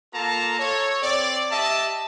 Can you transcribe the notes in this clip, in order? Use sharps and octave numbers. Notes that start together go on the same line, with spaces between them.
A#3 F4 A4 A5 A#5
A4 C#5
C4 D5
G4 D#5 E5 A5